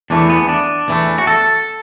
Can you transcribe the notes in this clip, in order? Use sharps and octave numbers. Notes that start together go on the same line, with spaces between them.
E2 E3 A3 D4
B3
D4
E2 E3 A3
F#4
A4